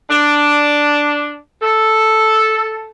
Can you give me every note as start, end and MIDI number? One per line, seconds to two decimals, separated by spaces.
0.09 1.36 62
1.62 2.90 69